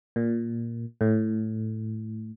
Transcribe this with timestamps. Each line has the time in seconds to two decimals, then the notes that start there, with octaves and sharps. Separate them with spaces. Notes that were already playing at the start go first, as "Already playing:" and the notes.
0.16 A#2
1.01 A2